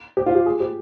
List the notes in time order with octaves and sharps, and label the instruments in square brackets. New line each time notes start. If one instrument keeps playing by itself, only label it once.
[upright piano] G4
F4
G4
G#4
G4